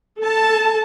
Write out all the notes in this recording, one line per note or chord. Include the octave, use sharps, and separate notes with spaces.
A4 A5